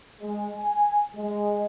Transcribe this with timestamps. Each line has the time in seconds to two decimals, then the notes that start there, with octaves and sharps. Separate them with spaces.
0.21 G#3
0.58 G#5
1.16 G#3